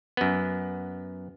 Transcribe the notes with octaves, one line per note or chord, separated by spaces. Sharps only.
F#2 B3